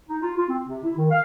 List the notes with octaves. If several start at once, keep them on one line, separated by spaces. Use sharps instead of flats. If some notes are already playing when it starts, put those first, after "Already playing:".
D#4
F4
F4
C4
C3
E4
D#3
F5